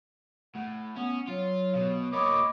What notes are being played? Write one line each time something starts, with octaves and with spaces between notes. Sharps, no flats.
A2 F#5
B3 C#4
F#3 F4
B2
A#3 F#4 C#5 D#5 B5 D6